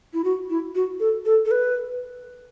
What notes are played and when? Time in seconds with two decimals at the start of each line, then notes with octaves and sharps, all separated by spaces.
0.13 E4
0.24 F#4
0.50 E4
0.75 F#4
1.00 A4
1.26 A4
1.46 A4
1.51 B4